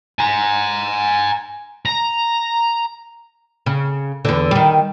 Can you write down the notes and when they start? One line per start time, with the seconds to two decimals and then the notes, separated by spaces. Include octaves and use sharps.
0.19 G#5 A#5
1.86 A#5
3.66 C#3
4.25 E2 D3
4.51 D#3 G3